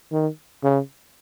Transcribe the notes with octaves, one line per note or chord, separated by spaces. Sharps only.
D#3
C#3